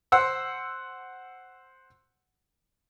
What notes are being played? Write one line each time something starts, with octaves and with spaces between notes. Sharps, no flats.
C5 F#5 E6